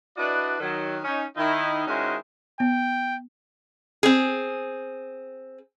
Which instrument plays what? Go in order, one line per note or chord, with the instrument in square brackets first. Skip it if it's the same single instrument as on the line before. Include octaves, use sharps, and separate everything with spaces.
[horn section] D4 E4 F#4 B4 D5 D#5
D#3 F#3
C#4 D#4
D#3 D#4 E4
D#3 G#3 C#4 E4 F#4 C5
[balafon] B3 [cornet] G5
[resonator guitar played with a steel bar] C4 G#4